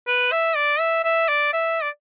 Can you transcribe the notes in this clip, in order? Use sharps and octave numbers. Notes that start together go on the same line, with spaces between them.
B4
E5
D5
E5
E5
D5
E5
D5